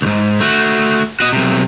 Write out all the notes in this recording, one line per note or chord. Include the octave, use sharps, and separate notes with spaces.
C#2 G#2
A3 F#4
F#4 D#5
B1 C3